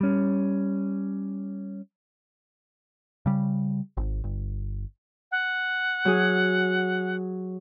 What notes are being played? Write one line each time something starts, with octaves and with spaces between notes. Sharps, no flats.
G3 C#4
C#3 G3
G#1
G1
F#5
F#3 G#4